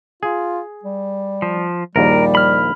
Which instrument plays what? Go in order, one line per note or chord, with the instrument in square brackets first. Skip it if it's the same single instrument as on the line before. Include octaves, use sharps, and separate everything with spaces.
[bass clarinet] F4 [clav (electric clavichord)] G#4
[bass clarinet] G3
[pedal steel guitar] F3
[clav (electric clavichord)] A#1 D#2 [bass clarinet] G3 [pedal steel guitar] A#4
[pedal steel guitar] B5 F6